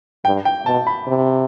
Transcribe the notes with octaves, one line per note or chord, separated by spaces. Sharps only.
G2 G5
G5
B2 A5
B5
C3